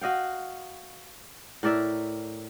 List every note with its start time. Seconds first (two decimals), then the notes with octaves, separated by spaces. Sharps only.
0.01 F#4 D#5 F5 G5
1.63 A2 A#4 D5 E5